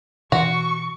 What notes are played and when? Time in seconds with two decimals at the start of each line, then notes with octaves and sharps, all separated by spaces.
0.32 B2 E3 F#4 C#6